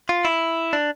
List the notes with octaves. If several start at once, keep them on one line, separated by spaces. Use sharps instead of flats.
F4
E4
D4